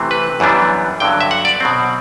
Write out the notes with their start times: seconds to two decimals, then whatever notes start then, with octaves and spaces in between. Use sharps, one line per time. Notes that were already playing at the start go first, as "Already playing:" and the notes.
Already playing: C3 E3 A3 C4
0.11 B4
0.40 F#2 E3 G3 B3 D4
1.00 G2 D3 F#3 G5
1.21 E5
1.31 F#5
1.45 D5
1.60 B2 F#3 C4